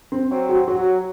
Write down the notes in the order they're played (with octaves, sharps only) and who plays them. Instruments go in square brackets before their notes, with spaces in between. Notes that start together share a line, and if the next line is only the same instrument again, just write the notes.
[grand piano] C4
[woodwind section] F#3 C4
[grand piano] F#4
[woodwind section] F#3 [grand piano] F#4